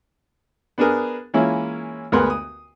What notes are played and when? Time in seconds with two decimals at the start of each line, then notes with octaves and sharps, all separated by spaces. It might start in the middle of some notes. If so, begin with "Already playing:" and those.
0.78 B3 D4 G#4 A#4
1.34 E3 G#3 A#3 C#4 E4 F4
2.12 D2 G#3 B3 A#4 C6
2.30 D#6